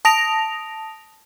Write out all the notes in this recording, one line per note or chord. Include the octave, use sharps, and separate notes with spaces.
A5 D#6 A#6 D7 F7